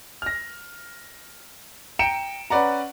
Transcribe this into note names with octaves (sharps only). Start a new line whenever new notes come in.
F6 A#6
G5 A#5 C#7 D7 E7
C#4 B4 D5 F#5 A#5